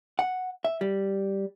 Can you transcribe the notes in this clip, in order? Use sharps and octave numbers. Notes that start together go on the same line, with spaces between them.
F#5
E5
G3